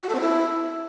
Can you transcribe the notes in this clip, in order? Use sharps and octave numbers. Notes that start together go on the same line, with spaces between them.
F#4
A4
C4
E4